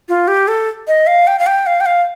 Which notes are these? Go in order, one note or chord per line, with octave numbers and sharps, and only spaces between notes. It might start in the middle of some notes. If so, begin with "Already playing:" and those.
F4
G4
A4
D#5
F5
G5
F5
G5
F5
G5
F5